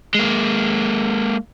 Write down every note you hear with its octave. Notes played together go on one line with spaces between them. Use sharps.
G#3 A#3